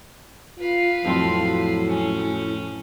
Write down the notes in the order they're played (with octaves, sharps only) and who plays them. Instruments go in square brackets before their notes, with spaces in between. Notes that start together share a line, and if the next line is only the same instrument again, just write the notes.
[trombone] F4 [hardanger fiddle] B4 F5
[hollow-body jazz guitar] F2 C4 F4 [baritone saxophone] A2 [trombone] F#3
[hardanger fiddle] C#4